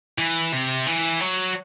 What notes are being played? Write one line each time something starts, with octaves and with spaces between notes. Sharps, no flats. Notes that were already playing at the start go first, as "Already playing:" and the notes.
E3
C3
E3
F#3